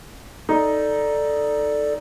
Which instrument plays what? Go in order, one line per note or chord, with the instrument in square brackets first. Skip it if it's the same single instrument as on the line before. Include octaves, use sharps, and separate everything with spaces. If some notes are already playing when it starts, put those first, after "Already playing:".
[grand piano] D#4 [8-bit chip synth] A4 D5